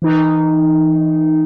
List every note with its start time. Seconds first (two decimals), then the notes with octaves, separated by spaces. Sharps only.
0.02 E3 D#4